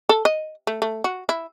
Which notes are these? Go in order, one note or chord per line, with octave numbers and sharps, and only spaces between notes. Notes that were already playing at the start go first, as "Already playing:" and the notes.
A4
D#5
A3
A3
F#4
E4